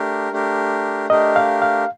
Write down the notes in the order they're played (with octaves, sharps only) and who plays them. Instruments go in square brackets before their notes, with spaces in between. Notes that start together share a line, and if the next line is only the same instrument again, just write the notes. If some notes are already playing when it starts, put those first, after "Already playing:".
Already playing: [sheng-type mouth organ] A3 D4 G4 A#4
A3 D4 G4 A#4
[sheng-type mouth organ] A3 D4 G4 A#4 [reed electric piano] D#5
[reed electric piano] F5
F5